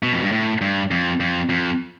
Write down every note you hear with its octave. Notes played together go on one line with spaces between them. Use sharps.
B2
F2
G2
A2
G2
F2
F2
F2